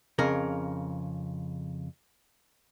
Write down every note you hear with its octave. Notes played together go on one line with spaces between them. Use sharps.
F2 C#3 A#4